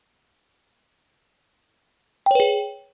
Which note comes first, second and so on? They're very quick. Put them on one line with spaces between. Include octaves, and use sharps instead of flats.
G5 C#5 B4 G#4